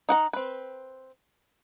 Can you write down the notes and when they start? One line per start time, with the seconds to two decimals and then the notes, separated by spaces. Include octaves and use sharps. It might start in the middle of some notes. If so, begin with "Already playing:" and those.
0.09 D#4 F#5 A#5
0.33 C4 B4